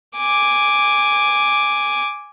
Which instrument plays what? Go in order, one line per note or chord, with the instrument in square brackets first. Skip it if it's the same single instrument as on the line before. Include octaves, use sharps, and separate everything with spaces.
[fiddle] G#5 D6